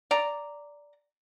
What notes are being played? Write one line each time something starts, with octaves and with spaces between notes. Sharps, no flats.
D5 A#5